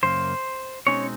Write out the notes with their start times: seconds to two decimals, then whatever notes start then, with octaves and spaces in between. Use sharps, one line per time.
0.03 F#2 C#3 A#3 C5
0.87 B2 G#3 C4 C#4 D#4 C#5